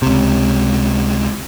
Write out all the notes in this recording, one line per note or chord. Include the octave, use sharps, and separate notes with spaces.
C#2 C3